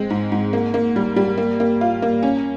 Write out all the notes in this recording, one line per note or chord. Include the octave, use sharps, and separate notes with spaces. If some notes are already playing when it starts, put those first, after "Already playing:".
Already playing: G#3 C4
G#2
G#2
A#3
A#3
G3
G3
A#3
A#3
F4
A#3
C#4